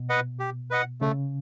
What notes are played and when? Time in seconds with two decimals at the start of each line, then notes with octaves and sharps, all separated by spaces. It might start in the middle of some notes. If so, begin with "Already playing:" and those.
Already playing: B2
0.09 B4 D#5 F#5
0.39 G4
0.71 B4 D#5 F#5
1.01 C#3 A3